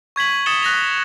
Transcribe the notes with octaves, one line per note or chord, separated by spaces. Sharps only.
C#6 G#6 B6 F#7
D#6 A6 C#7 E7 G7
F#6 A#6 F7